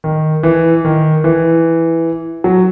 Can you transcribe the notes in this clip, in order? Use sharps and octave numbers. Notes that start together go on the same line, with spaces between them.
D#3
E3
D#3
E3
F#3